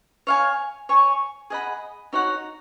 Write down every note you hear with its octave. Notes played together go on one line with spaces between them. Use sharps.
C#5 F5 G#5
C#5 G#5 C#6
G#4 D#5 F#5 B5
D#4 F#4 C#5 F#5